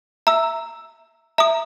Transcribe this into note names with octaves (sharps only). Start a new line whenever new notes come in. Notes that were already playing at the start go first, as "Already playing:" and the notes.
E5 A#5 E6
E5 A#5 D#6